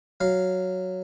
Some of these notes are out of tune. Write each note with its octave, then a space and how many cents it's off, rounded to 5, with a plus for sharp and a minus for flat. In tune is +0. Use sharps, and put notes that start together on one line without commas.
F#3 +0 F5 +0